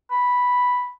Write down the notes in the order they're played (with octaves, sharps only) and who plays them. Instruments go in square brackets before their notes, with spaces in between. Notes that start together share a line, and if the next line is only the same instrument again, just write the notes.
[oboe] B5